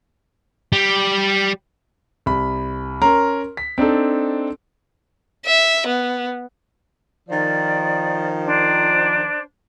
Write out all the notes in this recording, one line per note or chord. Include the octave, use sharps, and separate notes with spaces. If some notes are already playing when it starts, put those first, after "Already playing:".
G3
C2 B5
C#4 A#4 A#5 C6
B6
C4 D4 D#4 A4
E5
B3
D#3 F3 D5
D4 C5